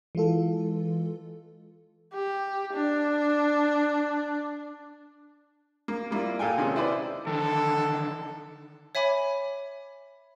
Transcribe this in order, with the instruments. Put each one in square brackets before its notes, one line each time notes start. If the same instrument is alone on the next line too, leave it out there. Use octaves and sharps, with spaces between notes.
[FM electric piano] E3 G#3 F4 A4
[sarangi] G4
D4
[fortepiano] A#3
G3 A#3 E4 F4
A#2 A4 F5 G5 G#5
C3 D#3 G#3 C#4
E4 B4 C5 D5
[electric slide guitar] D3 D#3 [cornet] A4
[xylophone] C#5 E5 G#5 B5 D6